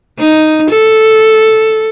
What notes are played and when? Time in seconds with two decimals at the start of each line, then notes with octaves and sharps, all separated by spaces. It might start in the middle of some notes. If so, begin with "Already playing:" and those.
0.19 D#4
0.70 A4